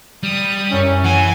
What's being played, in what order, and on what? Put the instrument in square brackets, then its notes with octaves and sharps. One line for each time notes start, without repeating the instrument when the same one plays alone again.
[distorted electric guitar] G3 [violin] D#6
[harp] F#2 E4 [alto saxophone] C#4
[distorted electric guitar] E3 [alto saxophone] F#5 [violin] G#5 [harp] D#7